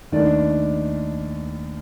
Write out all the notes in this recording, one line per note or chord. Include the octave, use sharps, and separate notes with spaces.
D#2 D#3 A3 D4 D5